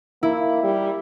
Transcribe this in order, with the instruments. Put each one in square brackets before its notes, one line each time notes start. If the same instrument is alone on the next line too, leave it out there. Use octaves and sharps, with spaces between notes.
[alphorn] A#3 [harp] E4
[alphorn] G3